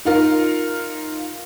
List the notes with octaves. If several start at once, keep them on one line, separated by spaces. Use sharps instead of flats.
D#4 F4 A#4